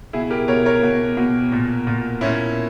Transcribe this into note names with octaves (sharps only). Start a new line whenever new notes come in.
B2 E4 G#4
G4 A#4
B2 A#4 C#5
A#4 C#5
B2
B2
A#2
A#2
A#2 C#4 E4